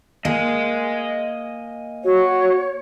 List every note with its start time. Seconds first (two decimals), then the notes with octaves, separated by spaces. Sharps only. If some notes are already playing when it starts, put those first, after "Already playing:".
0.25 A#3 D#5 G#5
2.04 F#4 C#5